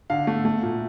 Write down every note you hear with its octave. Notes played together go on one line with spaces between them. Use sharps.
D3 F5
A3
A3
A#2